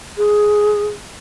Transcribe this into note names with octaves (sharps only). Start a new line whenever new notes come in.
G#4